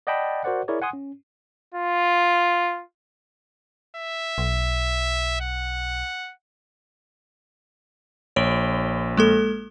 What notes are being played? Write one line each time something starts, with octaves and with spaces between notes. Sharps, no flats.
D5 D#5 F#5 G5 A5 B5
F#4 A#4 C5 D5 F#5
E4 G#4 A#4 C#5 D5
F#5 G#5 C6 D#6
C#4
F4
E5
B1
F#5
A#1 C#5 D7 G7
G#3 A#3 A4